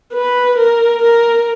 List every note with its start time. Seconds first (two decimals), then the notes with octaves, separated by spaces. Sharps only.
0.14 B4
0.58 A#4
1.02 A#4